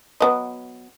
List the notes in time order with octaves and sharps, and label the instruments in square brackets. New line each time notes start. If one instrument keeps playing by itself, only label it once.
[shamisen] F#3 B3 D#5